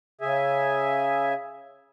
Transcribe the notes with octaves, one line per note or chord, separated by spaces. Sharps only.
C#3 G#4 E5 G#5